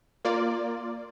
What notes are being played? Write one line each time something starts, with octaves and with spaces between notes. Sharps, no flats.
A#3 F4 D5